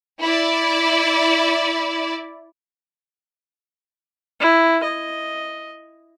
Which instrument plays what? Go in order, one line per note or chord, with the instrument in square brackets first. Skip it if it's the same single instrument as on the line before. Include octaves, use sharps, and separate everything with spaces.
[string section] E4 D5
[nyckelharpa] E4
D#5